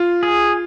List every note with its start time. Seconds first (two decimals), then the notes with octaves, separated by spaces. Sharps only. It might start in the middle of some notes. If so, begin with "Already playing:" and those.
Already playing: F4
0.23 G#4